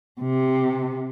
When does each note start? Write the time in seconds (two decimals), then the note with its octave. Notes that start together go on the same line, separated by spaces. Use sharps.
0.21 C3